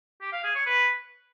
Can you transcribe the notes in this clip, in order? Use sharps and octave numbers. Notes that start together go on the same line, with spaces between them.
G4
F5
G#4
C#5
B4